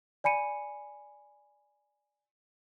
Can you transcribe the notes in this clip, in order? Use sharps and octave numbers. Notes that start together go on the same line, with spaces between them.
D5 G#5 B5 C#7 D#7